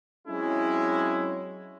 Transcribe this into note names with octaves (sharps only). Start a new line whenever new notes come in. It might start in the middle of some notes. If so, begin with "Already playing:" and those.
F#3 G#3 C4 C#4 E4